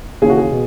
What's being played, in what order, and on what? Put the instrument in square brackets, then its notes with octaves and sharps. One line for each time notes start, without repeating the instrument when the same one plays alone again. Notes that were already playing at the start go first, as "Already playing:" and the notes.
[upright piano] D#2 C#3 E3 A#3 [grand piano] G#4
[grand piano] F#4
G#4
[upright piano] B2